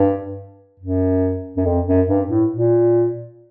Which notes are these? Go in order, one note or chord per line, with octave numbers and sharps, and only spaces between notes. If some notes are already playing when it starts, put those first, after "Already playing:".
Already playing: G2
F#2
F#2
F2
F#2
G2
A2
A#2